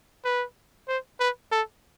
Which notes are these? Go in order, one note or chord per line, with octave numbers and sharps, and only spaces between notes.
B4
C5
B4
A4